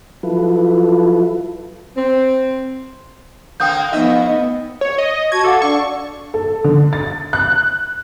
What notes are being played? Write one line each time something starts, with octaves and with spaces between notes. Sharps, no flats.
F3 F#3 E4 F4 A4 B4
C4
D3 A#3 C4 G5 D#6 G6
F2 B3 D#4 D#5 E5
C#5
D#5
F#4 A5 C#6 G#6
A4 F5 F#5 D6
D4 D5 C#6
A4
D3
A6
F#6